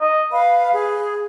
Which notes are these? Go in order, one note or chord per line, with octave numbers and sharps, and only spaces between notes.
D#5
B4 F5
G#4